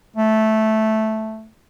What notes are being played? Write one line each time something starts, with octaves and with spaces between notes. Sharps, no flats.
A3